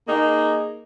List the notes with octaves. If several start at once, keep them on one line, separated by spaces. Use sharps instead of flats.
A#3 D#4 G#4